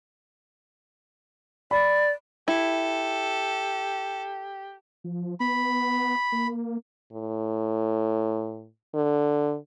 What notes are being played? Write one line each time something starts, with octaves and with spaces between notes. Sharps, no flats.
D5 B5
E4 G4 A4
F3
B3 B5
A#3
A2
D3